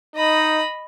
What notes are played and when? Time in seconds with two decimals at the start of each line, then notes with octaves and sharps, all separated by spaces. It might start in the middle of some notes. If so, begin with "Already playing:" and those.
0.16 D#4 D#5 B5